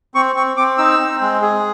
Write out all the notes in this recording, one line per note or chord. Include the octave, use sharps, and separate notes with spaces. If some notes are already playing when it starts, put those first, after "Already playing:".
C4 C#6
C4 C#6
C4 D6
D#4 E6
C4
G#3
G#4